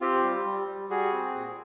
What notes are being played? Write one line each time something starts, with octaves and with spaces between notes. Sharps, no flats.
C4 F4 G4
G3
G3
G3
G3 F#4 G#4
C4
A#2